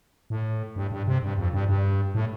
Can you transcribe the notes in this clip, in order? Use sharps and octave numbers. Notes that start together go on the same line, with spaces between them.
A2
G2
G2
C3
G2
F2
G2
G2
A2